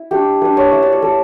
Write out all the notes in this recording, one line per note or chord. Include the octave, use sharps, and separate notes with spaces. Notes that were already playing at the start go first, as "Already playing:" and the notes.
Already playing: E4
A3 D4 G4
A3 D4 B4
C#5
A3 E4 E5
D5
C#5
A3 E4 A4